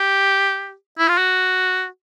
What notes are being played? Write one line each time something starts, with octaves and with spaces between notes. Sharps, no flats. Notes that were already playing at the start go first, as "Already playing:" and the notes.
Already playing: G4
E4
F4
F#4